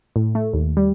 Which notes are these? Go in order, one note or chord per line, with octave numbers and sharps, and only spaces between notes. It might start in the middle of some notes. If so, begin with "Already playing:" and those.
A2
A3
D#2
G3